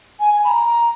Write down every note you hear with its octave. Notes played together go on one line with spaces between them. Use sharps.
G#5
G#5
B5
A#5